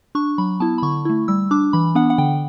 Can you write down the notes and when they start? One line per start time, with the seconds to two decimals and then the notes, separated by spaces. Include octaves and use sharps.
0.15 D4 C#6
0.38 F#3 B5
0.60 B3 E4 A5
0.78 B5
0.82 D3 C#6
1.05 A3 E4
1.28 G3 E6
1.51 D4 D6
1.73 E3 B5
1.95 B3 D4 F#5
2.10 F#5
2.18 D3 G5